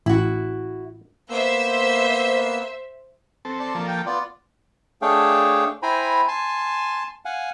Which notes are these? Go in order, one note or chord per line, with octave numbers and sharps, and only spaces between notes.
A1 E4 F#4
A#3 B3 C5 E5 E6
C4 A4
D5 A5
F3 A#3 A4
G5
B3 F4 D5
A3 D4 G#4 C#5 F5 G5
E4 C5 G5 G#5 A#5 B5
G#5 A5 C6
F5 F#5 G#5